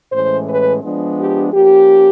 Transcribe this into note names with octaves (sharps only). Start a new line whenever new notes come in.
A2 E3 G#3 C#4 C5
B4
F3 G#3 B3 D4
G4
F3 A#3 C#4 G4